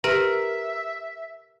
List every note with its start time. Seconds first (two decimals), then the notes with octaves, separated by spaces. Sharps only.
0.04 G4 A#4 B4 E5 A#5